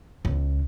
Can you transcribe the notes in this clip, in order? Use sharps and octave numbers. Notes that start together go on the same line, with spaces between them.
C#2